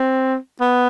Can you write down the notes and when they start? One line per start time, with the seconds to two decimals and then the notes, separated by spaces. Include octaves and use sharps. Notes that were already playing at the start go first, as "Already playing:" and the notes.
Already playing: C4
0.61 B3